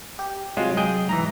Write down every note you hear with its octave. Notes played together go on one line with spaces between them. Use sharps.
G4
C3 F#3 G#3 F4
G#4 D#5 G5
G#2 E3 A#5 A#6